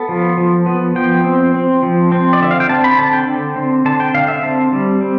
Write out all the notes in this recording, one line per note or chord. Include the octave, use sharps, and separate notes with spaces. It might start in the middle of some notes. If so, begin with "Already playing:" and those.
Already playing: B3 A4
F3
F3
B3
F3 G5
C4
C4
F3
C4
D5
D3 E5
F5
G5
C4 A5
B5
D3 A5
G5
D3
C4
D3 A5
G5
D3 F5
E5
C4 A5
G3
C4